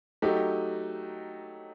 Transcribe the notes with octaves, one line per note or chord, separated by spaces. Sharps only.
F#3 A3 D#4 G4